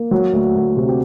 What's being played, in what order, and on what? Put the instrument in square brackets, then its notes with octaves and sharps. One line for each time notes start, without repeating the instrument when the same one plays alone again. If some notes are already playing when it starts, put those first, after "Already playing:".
Already playing: [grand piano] A#3
F#3
D2
D2
C3
G4